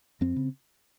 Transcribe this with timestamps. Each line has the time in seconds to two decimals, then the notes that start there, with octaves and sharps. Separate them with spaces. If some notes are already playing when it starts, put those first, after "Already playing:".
0.21 F2 C4
0.36 C#3